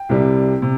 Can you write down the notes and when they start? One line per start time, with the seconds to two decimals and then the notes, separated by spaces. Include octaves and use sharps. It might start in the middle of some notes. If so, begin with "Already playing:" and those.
Already playing: G5
0.09 C2 C3 G3
0.62 C3